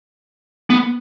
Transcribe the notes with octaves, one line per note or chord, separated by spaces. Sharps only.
B3